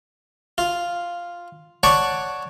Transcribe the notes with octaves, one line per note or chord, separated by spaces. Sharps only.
F4
C#5 D5 F#5 A5 C#6 D6